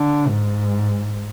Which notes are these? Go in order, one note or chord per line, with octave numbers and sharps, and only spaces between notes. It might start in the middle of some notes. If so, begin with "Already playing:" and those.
Already playing: D3
G#2